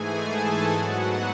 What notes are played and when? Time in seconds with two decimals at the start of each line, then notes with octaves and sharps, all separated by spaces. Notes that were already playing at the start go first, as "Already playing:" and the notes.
Already playing: G#2 E3 A3 G#4 G#5
0.22 A4 A5
0.70 G#2 F#3 B3 F#4 F#5